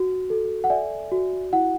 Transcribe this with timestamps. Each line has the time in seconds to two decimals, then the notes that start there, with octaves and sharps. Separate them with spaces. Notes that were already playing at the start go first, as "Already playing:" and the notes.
Already playing: F#4
0.30 A4
0.64 F#5
0.70 D5 E5 G#5
1.12 F#4
1.53 E4 F#5